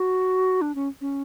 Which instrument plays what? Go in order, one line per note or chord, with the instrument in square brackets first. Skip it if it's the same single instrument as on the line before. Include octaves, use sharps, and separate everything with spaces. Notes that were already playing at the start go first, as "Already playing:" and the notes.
Already playing: [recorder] F#4
D4
C#4
C#4